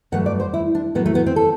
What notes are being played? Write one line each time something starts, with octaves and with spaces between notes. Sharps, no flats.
G2 F#3 A3 F#5
D5
C5
E4
D4
A2 F#3 A3 B3
A3
B3
C4
A4